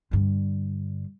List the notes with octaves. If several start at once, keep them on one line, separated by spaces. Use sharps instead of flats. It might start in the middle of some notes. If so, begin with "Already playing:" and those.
G2 D3